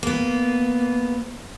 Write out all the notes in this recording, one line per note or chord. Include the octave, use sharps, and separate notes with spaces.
A#3 B3